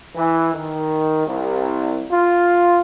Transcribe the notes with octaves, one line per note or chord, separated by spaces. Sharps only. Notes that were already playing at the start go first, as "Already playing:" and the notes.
E3
D#3
C2
F4